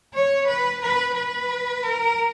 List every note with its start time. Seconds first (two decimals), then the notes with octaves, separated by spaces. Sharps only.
0.15 C#5
0.48 B4
0.82 B4
1.15 B4
1.83 A#4